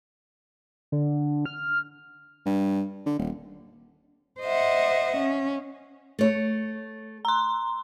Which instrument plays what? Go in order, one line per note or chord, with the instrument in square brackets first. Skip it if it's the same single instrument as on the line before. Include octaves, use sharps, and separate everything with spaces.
[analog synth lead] D3
F6
[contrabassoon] G2
D3
D#1
[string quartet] C5 D#5 E5 F#5
C#4
[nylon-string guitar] A3 C#5
[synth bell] A#5 C6